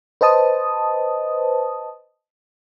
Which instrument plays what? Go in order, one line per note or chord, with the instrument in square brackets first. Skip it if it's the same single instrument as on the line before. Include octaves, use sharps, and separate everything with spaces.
[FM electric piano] B4 C5 D#5 A5 D#6